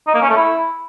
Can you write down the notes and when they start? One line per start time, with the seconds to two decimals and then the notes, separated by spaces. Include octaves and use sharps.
0.07 D#4
0.15 A#3
0.22 C#4
0.29 A3
0.37 E4